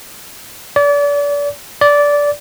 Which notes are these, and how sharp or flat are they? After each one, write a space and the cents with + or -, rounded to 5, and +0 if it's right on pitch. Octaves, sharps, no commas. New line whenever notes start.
D5 -35
D5 -15